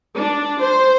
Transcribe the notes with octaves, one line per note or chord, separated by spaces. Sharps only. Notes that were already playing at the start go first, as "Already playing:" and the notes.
D4
C5